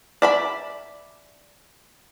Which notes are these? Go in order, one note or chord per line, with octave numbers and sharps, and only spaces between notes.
D5 E5 B5